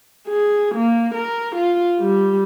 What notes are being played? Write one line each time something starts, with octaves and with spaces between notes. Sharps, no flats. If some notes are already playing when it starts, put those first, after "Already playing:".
G#4
A#3
A#4
F4
G3